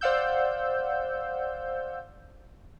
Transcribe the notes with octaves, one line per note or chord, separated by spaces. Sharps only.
C5 D5 F5 F#5 E6 G6